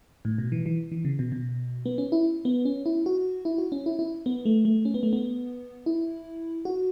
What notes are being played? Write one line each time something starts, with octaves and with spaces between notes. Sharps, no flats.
A2
B2
E3
E3
E3
C#3
B2
B2
B3
C#4
E4
B3
C#4
E4
F#4
E4
F#4
C#4
E4
E4
B3
A3
A3
C#4
B3
A3
B3
E4
F#4